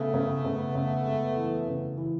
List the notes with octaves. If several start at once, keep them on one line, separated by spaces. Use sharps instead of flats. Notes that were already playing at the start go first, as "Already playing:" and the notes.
Already playing: C#3 A3 B3
C#3
C#3
C#3
G#3
E3
C#3
E3